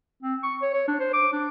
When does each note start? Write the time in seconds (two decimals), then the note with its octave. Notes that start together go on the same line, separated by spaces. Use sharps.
0.23 C4
0.43 C#6
0.62 C#5
0.74 C#5
0.88 D4
1.00 C5
1.13 D6
1.33 D4